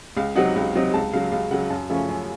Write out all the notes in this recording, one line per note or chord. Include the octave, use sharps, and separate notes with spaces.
C#2 F5
C3 F#3 C4 D#4 F#5
C#2
C3 F#3 C4 D#4
C#2 A5
C#3 F#3 F5
C#2 F5
C#3 F#3 F#5
F#2 A5
C#3 F3 A3 C#4
F#2